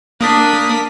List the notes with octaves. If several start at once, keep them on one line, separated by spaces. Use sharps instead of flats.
A#3 D4 D#6 B6